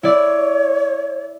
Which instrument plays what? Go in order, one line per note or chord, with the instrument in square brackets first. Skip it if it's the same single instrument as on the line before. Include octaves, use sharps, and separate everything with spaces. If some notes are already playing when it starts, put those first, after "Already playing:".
[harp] E4 D5 [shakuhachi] C#5